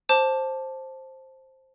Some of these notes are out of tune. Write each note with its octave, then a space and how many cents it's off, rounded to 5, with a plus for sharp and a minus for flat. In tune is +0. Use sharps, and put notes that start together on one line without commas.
C5 +10 A5 +0 D6 +0